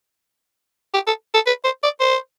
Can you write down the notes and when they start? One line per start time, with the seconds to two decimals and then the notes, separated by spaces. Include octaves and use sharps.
0.94 G4
1.07 A4
1.34 A4
1.47 B4
1.65 C5
1.83 D5
2.00 C5